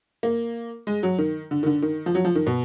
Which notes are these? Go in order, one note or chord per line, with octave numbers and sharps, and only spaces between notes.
A#3
G#3
F#3
D#3
D3
D#3
D3
D#3
F3
F#3
F3
D#3
B2